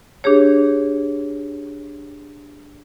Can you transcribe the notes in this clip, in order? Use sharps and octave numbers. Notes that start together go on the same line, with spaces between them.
D4 G4 G#4 C#5